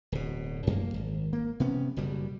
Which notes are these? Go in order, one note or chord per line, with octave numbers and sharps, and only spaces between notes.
D1 B2
F#2 A#3
G#1
A#3
C3 B3 C#4
F#1 B2 G3